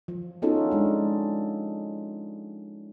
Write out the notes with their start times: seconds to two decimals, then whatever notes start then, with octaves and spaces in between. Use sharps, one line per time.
0.08 F3
0.42 B3 C#4 D#4 F4 F#4 A4
0.71 G#3 D4